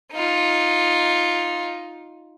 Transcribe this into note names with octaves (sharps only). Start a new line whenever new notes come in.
D#4 F4